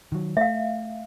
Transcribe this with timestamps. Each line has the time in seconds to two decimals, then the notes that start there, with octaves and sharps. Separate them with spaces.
0.12 D#3 F#3
0.37 A3 E5 F5